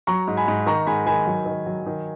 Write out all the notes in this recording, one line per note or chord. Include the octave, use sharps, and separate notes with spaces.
F#3 A#5 C#6
G#2
G#5 B5
G#2
D#3 A#5 C#6
G#2 G#5 B5
D#3 G#5 B5
F#3
D#3
F#3
D#3